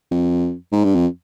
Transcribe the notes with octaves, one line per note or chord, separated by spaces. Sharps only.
F2
G#2
G2
F2